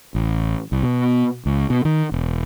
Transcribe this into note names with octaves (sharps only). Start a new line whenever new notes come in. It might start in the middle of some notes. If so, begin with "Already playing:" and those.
A1
C2
B2
C#2
B2
D#3
E1